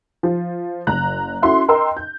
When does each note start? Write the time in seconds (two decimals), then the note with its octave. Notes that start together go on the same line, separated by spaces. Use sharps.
0.23 F3
0.87 F#1 A#5 F#6
1.42 C#4 E4 F#4 A4 C6
1.69 A#4 D#5 G5 C6 E6
1.97 G6